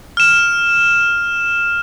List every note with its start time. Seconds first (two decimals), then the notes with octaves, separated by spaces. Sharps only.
0.17 F6 E7